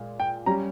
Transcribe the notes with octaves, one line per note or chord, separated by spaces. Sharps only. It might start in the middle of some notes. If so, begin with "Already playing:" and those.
Already playing: A#2 G#3
G5
G3 C#4 G4 A#5